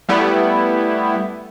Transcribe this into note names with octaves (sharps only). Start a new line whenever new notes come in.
G3 A3 B3 E4